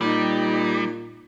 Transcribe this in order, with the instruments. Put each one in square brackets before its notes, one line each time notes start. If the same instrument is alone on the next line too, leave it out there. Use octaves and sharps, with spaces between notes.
[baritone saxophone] A#2 [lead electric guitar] G3 [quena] D#4